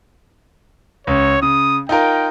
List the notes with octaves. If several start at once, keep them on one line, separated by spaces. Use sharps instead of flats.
C#2 C#5
C#3 D#6
D#4 F4 A#4 G5